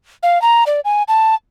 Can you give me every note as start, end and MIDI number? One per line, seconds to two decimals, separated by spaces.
0.23 0.41 77
0.42 0.64 82
0.67 0.80 74
0.85 1.03 80
1.08 1.35 81